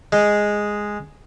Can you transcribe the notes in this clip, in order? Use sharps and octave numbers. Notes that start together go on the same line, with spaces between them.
G#3